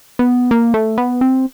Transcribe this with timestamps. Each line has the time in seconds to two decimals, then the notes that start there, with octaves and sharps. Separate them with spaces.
0.19 B3
0.51 A#3
0.74 A3
0.98 B3
1.21 C4